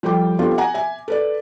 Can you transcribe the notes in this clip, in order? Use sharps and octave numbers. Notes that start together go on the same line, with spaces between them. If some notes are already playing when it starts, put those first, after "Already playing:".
F3 G3 G4 A4 G5 D6
B3 C4 D4 F4 G4 A4
F#5 G#5 A#5
E5 G#5
A4 B4 D5